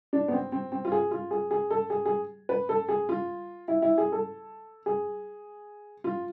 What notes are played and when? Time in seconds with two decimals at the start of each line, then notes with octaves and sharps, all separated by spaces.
0.13 D4
0.28 B3
0.33 C4
0.52 C4
0.72 C4
0.85 F4
0.92 G#4
1.11 F4
1.31 G#4
1.51 G#4
1.71 A4
1.90 G#4
2.06 G#4
2.49 B4
2.69 A4
2.89 G#4
3.09 F4
3.68 E4
3.82 E4
3.98 G#4
4.12 A4
4.86 G#4
6.04 F4